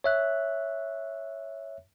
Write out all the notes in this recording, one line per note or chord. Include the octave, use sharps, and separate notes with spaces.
C#5 E5 F#6